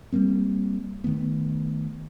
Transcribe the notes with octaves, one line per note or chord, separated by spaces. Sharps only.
G3 A3 A#3 C4
D#3 F3 A3 B3